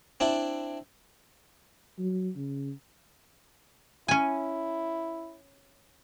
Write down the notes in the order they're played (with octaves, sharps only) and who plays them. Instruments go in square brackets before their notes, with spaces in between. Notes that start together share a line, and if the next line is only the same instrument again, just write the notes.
[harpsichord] C4 D4 E4
[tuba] F#3
C#3
[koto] C#4 G#5 [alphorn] E4